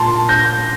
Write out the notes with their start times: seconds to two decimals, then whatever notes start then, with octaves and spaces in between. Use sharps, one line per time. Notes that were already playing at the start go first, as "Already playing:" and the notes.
Already playing: A#2 A5 C6
0.29 G6 A#6